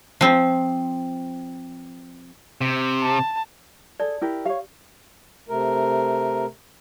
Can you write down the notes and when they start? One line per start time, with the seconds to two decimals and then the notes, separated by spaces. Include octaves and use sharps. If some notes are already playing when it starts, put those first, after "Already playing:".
0.21 F3 C4
2.61 C3
3.02 A5
4.00 G#4 A4 D5
4.21 E4 G4 A#4
4.46 G4 C#5 F5
5.49 C3 A3 A#4